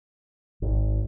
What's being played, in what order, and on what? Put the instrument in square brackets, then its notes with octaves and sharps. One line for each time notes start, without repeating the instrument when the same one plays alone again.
[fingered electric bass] G#1